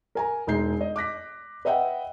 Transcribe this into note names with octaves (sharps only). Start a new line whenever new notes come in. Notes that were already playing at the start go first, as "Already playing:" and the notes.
A#4 G#5 A#5
E1 G#3 D#4 G6 C7
D#5
D6 F#6 A#6 B6
B4 D#5 E5 F#5 G5